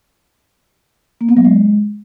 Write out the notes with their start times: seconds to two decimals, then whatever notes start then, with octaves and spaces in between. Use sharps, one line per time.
1.21 A#3
1.29 B3
1.37 F#3
1.45 G#3